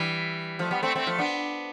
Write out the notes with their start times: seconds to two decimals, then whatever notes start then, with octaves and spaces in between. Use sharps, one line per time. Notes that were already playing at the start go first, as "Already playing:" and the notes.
Already playing: E3 G3
0.59 F3 A3
0.71 G3 B3
0.83 A3 C4
0.96 A3 C4
1.07 F3 A3
1.18 B3 D4